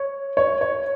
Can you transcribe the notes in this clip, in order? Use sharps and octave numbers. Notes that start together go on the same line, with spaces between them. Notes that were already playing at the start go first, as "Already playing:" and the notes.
Already playing: C#5
C#5
C#5